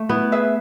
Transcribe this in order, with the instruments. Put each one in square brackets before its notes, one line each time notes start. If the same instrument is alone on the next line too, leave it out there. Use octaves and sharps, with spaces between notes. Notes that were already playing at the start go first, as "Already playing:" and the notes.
Already playing: [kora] A3
[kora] B3 [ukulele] E4
[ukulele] G#4 B4 E5